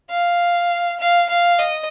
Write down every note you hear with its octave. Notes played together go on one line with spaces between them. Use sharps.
F5
F5
F5
D#5